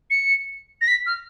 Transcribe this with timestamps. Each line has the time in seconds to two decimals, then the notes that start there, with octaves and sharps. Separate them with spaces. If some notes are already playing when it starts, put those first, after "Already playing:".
0.10 C#7
0.81 A#6
0.88 B6
1.06 F6